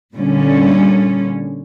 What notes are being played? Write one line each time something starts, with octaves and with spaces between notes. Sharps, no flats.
A#2 D3 G3 C#4